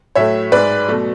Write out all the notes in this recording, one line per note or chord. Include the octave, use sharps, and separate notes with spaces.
A2 F#3 A3 C#5 E5
G#2 G#3 B4 D5
B2 F#3 A3